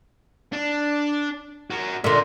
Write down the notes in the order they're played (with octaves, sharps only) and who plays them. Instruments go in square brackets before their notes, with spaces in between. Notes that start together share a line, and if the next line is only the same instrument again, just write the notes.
[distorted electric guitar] D4
F#4 A#4
[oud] A#2 D3 [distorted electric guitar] A#4 E5